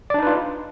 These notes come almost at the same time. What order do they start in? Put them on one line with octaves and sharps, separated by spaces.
D5 D4 D#4 B4 F4